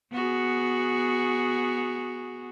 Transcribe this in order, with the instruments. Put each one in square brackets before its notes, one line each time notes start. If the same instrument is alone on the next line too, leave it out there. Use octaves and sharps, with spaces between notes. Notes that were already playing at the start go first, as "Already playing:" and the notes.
[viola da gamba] B3 F#4 G#4